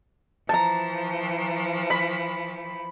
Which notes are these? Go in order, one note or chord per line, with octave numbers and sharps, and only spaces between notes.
E3 F3 A5 A#5
B5